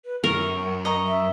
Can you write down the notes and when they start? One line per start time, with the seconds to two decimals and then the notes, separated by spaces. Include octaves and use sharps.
0.05 B4
0.24 F#2 A#4 C#6
0.85 D#5 A#5 C#6
1.07 E5